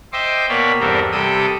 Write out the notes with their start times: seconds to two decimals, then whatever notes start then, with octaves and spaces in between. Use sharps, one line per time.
0.13 C5 D#5 E5 G5 C6 D6
0.49 B2 A#3 C#5 D5 B5
0.80 E2 G2 G3 C4 A4 A#4
1.12 C3 G3 A4 G5 D#6